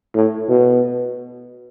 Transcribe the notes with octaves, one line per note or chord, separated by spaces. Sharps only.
A2
B2